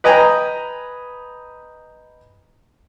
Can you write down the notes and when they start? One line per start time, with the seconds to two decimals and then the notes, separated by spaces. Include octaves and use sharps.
0.04 B4 D#5 G5 G#5 A#5